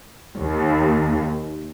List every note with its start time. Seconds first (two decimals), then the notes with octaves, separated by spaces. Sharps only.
0.40 D#2